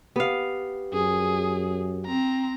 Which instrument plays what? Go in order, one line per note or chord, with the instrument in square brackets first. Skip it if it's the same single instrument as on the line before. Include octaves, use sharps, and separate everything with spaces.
[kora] B3 F5 [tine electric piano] G4
[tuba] F#2 [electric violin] G#4
[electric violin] C4 A#5